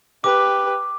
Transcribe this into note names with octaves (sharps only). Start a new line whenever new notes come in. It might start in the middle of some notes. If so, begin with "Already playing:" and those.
G4 B4 D6